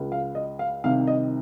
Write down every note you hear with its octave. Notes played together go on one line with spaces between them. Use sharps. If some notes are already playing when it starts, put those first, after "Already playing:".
Already playing: C#2 C#3
F5
D#5
F5
C2 C3 D#3 F5
D#5